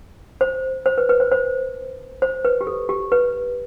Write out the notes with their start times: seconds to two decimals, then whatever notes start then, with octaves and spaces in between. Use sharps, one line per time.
0.41 C5
0.86 C5
0.98 B4
1.09 B4
1.20 C5
1.32 C5
2.22 C5
2.45 B4
2.61 G4
2.67 A4
2.89 G4
3.12 B4